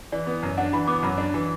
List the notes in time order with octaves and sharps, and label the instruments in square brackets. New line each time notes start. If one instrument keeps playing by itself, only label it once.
[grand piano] E3 [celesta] D5
[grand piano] B3
F#2
[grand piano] D4 [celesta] F#5
[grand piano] E3 [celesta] B5
[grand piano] B3 [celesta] D6
[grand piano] F#2 [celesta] B5
[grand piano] D4
E3